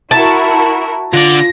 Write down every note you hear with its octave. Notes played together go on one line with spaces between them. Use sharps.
E4 F#4 A#4 A5
D3 F4 D5 A#6